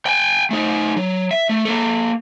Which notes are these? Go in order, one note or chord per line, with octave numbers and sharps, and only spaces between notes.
G5 G#5
A3 D#4
F#3
E5
A3
A#3 A4